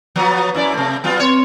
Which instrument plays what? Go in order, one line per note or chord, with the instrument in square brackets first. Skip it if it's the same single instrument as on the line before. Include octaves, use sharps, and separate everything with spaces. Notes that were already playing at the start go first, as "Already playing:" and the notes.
[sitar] F3 F#3 B3
F#2 E4 D5
C3 A3
F#3 B3 F4
[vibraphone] C4 C6 [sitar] C#5